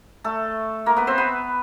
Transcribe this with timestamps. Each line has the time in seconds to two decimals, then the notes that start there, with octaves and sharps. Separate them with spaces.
0.24 A3 A4
0.86 A#3 A#4
0.96 B3 B4
1.07 C4 C5
1.18 B3 B4